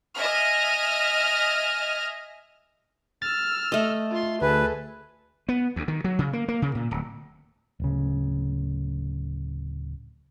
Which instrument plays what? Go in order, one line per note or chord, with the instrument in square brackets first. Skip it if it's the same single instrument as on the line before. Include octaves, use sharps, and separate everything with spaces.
[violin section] D#5 E5 G#5 F6
[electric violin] E6 F6 [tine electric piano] A6
[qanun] A3 D#5
[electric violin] F4 C6
[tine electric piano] D2 [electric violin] G#4 A4 [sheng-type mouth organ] B4
[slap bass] B3
D2
D#3
F#3
C#3
A#3
A#3
C#3
A#2
D1
[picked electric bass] D1 C#3